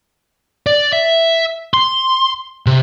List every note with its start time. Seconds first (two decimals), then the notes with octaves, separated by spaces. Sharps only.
0.67 D5
0.93 E5
1.74 C6
2.66 C3